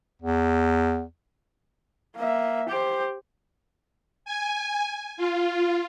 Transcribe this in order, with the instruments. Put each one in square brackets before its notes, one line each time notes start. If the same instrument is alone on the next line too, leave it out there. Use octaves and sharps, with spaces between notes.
[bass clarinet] E2
[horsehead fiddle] A#3 E5
G4 C5
[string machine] G#5
F4